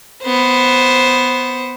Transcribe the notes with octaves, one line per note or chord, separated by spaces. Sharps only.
B3 C5